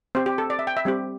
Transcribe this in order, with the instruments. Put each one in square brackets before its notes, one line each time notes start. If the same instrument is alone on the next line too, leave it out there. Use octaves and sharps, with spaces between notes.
[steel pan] C4 G4 C5
G4
A4
D5
E5
G5
E5
G3 C4 G4